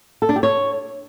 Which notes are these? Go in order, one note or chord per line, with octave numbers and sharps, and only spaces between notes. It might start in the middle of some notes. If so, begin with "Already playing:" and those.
A4
D4
G4
C#5